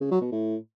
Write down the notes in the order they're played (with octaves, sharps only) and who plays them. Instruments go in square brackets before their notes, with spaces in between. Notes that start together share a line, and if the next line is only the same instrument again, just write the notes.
[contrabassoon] C#3
F#3
B2
A2